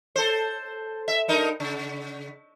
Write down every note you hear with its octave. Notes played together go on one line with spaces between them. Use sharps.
A4 C5
E5
G2 D#4 A#4
C#3